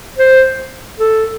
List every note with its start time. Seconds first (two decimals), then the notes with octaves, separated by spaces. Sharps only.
0.18 C5
0.99 A4